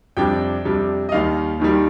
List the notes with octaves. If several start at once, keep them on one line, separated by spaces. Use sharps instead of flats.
F2 C3 G3 D4 G5
F2 C3 G3 D4
D#5
D#2 D#3 G3 F5
D#2 D#3 G3